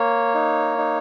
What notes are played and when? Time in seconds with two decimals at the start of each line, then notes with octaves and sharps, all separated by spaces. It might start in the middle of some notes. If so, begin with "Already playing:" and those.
Already playing: A#3 C#5
0.35 D#4
0.78 D#4